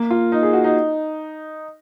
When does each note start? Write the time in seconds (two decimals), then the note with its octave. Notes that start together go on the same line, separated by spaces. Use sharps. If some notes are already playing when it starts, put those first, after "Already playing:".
Already playing: A#3
0.11 F4
0.32 D#4
0.43 G#4
0.53 F#4
0.64 D#4